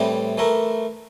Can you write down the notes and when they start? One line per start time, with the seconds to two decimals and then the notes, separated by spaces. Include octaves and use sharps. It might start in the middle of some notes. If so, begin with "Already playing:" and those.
Already playing: A2 E3 G3 C4
0.38 E3 A3 E4 A#4